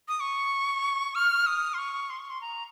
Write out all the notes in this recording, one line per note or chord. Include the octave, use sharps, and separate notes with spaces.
D#6
C#6
F6
D#6
C6
C#6
C6
C#6
C6
A#5